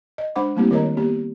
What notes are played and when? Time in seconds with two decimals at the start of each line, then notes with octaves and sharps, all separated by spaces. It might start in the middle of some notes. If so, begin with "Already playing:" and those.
0.18 D#5
0.36 G#3 D4 C5 F#5 B5 D6
0.56 G3 A3 A#3 C4 E4 G4
0.71 D#3 A#4 C#5 D#5 A#5
0.97 A#3 B3 G4